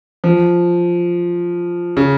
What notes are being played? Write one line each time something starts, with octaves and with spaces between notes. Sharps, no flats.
F3
C#3